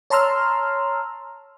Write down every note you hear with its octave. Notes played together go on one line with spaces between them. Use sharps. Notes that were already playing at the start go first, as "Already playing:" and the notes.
C#5 A5 A#5 C6 E6 F6